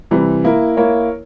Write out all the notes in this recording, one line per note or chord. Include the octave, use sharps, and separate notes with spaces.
C3 E3 G3
A#3 E4 A#4
A#3 E4 A#4 C#5